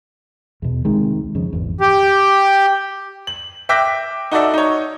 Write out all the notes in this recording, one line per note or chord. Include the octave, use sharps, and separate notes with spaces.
E2 B2
C2 C3 D#3 G#3
F2 C#3
G#1 E2
G4
F#7
E5 G5 D6 F#6 A#6 B6
D#4 F#4 A4 D5 E5
D#4 C#5